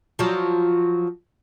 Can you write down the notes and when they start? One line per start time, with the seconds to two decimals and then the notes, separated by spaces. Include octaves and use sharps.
0.19 F3 F#3